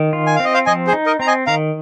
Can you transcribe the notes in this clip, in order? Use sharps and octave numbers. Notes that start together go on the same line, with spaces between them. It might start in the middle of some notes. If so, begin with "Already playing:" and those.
Already playing: D#3
F4
G#5
C4 F5
D#5
C5 F5
F3 D#5 G#5
G#4 C5
D#4
A#4 D#5
C4 A#5
D#5 G#5
D#3 F5 A#5